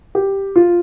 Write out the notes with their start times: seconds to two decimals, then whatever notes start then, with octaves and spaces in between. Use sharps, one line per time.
0.15 G4
0.56 F4